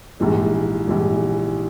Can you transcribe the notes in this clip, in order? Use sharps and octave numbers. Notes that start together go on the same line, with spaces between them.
A#1 G#2 E3 G3
A#1 G#2 E3 G3